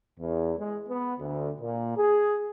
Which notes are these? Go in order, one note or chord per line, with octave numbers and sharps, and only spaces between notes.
E2
G#3
B3
D2
A#2
G#4